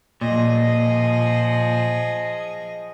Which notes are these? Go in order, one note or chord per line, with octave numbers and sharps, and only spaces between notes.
A#2 F3 G#4 D#5